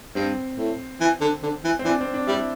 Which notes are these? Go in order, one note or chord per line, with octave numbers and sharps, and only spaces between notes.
G2 C4
A2
E3
D3
D3
E3
C4
E3 D4
C4
D4
G3 E4